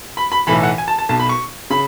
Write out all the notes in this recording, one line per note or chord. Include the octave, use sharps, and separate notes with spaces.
B5
B5
B1 A2 E3 B5
F#5
G#5
A5
A5
B1 B2 A5
B5
C#6
C#3 B5